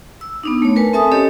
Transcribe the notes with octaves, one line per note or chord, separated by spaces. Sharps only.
E6
B3 D4 D#4
A3 C#5
A#4 B4 G#5 A5
C4 A4 E5 G#5 A5 D#6
C#4 G4 A4 C#5 D#5